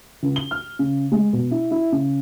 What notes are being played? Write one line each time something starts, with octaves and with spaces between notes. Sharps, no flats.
C#2
G7
F6
C#3
G#3
B2
E4
E4
C#3